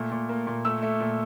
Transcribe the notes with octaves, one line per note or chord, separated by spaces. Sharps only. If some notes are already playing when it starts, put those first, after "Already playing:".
Already playing: A#2 A3
A#2
A#3
A#2
A3 E6
A3
A#2